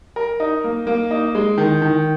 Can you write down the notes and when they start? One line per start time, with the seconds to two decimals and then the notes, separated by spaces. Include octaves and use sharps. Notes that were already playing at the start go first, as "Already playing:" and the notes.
0.16 A#4
0.40 D#4
0.64 A#3
0.87 A#3
1.11 D#4
1.35 G#3
1.58 D#3
1.82 D#3